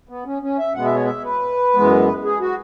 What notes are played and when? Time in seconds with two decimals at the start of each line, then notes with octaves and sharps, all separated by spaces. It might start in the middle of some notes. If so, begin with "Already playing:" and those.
0.09 B3
0.25 C#4
0.42 C#4
0.58 E5
0.75 B2 G#3 B3 F#5
0.85 E5
0.95 C#5
1.05 E5
1.24 B4
1.74 F#2 E3 G#3 B3
2.24 G#4
2.40 F#4